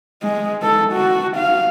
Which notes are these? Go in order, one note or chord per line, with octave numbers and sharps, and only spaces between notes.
G#3
A4
F#4
F5